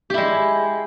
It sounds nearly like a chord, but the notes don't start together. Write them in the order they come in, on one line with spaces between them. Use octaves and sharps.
G4 E4 G#3